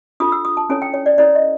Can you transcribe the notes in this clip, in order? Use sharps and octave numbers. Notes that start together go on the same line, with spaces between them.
D4 F4 A4 D#6
E6
D#6
A5
C#4 E4 A4 C#5 G#5
G5
C#5
D5
C#4 E4 A4 C#5 D5
D#5